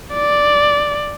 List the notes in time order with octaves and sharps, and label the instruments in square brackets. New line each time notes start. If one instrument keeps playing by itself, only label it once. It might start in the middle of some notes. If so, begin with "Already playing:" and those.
[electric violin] D5